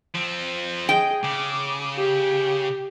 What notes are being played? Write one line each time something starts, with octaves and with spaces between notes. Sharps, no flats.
F3 C4
G#4 D#5 G5
C#3 D6
G4